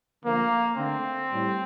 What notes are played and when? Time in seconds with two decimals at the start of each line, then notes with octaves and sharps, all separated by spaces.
0.23 D3 F3 A3 A#3
0.77 D3 A3 C4
1.31 A2 G3